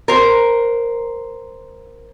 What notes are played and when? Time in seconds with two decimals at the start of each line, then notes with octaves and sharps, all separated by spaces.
0.08 A#4 C5